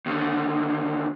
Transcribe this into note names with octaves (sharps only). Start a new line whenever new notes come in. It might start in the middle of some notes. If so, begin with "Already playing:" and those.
D#2 D3